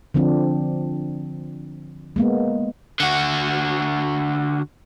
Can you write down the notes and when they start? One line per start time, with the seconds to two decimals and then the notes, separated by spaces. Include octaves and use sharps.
0.14 D3 F3 C4 D4
2.16 G#3 A#3 B3
3.00 D3 F#4